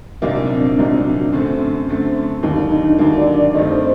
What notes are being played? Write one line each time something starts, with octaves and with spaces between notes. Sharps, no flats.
C2 A#2 F#3 A#3 D4 D#4
C4
D4
C4
C2 A#2 F#3 A#3 D4 D#4
F#4
F#2 D3 A3 C4
F#2 D3 A3 C4
D#2 D3 F#3 A#3 D#4
D4
D#4
D#4
D#2 D3 F#3 A#3 F#4
D5
D5
G2 D#3 A3 C4 D#5
C5